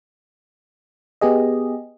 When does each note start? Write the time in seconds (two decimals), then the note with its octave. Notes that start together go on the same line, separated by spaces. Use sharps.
1.21 B3 G4 G#4 D#5